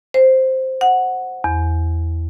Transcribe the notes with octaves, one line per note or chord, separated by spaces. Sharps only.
C5
F#5
E2